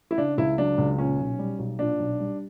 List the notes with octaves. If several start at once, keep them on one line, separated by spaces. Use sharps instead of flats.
E4
C#3 D4
C#2 E4
F#3 D4
C#2
A#2 C#4
B1
G3
B1
A#2 D4
B1
G3